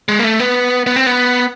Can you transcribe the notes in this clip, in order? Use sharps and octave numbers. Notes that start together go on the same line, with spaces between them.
G#3
A#3
A3
B3
B3
C4
B3